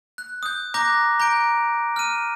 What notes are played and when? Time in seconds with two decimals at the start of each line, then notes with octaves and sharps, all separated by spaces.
0.18 F#6
0.43 D#6 G6
0.74 A#5 D6 F#6 G6 A#6
1.20 A#5 G6 D7
1.96 F6 D#7